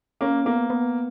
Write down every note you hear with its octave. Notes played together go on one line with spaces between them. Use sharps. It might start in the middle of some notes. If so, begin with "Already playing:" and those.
A#3 C#4
A#3 B3
B3